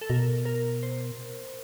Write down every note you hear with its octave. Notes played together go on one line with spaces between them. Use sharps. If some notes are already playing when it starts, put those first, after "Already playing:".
A4
B2 A#4
A#4
C5